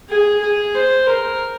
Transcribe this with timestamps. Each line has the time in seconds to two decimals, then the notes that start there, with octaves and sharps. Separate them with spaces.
0.09 G#4
0.41 G#4
0.74 C5
1.07 A#4